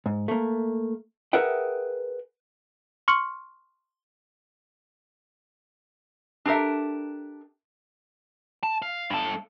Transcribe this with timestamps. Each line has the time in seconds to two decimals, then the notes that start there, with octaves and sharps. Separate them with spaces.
0.06 G#2
0.28 A3 A#3
1.33 G#4 A#4 B4 E5 F#5 G5
3.08 C6 C#6 F6 C#7 F#7
6.45 D4 G4 A4 A#4 E5
8.63 A5
8.82 F5
9.10 G2 A4